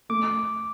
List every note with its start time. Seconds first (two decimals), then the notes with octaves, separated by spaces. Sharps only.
0.09 A3 D6